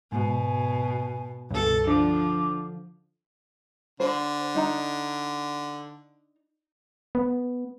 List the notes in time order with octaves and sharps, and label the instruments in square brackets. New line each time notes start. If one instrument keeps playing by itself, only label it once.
[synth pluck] G#2 [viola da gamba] B2 [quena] G#5
[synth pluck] C#2 G2 [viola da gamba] B2 A4
[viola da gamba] D3 F3 [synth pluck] D4 [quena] D6
[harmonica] D3 [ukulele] C5
[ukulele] D4 D#4 A#5
[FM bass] B3